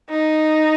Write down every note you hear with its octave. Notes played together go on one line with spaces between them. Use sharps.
D#4